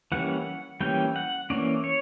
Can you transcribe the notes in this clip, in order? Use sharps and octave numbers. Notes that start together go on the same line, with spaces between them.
E3 G3 A#3 C#4 F#5
E3 G3 A#3 C#4 G5
F#5
E3 A#3 C#4 D5
C#5